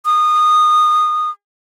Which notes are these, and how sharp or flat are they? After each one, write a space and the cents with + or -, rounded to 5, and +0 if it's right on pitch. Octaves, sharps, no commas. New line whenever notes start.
D#6 -20